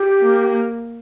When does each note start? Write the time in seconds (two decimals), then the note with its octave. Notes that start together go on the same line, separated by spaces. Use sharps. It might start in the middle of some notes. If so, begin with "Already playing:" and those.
Already playing: G4
0.20 A#3